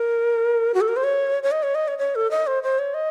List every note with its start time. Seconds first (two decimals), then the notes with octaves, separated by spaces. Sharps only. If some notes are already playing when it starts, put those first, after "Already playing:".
Already playing: A#4
0.74 F#4
0.81 A4
0.88 A#4
0.96 C5
1.04 C#5
1.43 C#5
1.52 D#5
1.63 C#5
1.75 D#5
1.88 C#5
1.99 C#5
2.15 A4
2.31 D#5
2.47 C5
2.63 C5
2.79 C#5
2.94 D#5